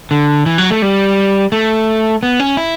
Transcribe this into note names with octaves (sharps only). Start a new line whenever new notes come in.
D3
E3
F#3
A3
G3
A3
B3
C#4
E4